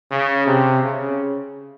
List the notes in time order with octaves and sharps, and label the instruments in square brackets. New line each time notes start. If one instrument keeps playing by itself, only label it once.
[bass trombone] C#3
C3
C#3